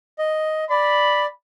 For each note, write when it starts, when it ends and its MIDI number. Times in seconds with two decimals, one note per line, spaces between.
0.19 0.64 75
0.70 1.26 74
0.70 1.27 83